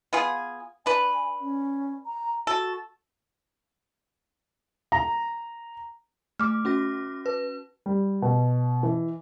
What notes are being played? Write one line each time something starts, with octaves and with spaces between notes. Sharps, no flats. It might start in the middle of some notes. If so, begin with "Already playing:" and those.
B3 F4 G#4
D4 B4 G#5
C#4
A#5
F#4 A4
A#5
A3 D6 F6
C#4 F#4 A#6
B4
G3
B2
E3